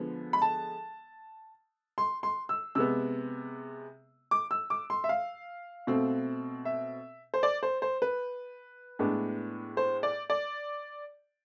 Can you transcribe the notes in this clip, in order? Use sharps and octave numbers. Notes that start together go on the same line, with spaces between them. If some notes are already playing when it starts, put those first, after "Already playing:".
Already playing: D3 F3 G#3 B3
B5
A5
C6
C6
E6
C3 G#3 B3 E6
D6
E6
D6
C6
E5
F5
B2 A3 C4
E5
C5
D5
C5
C5
B4
A2 G#3 B3 D4
C5
D5
D5